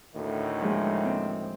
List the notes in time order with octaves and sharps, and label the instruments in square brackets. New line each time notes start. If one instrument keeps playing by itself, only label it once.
[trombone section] D2 A2 D#3
[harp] F3 G#3
C4